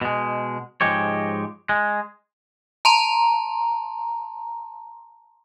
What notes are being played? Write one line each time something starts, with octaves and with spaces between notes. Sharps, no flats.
B2 G#3
G#2 F3 G#3 G4 C#5
G#3
A5 A#5 C6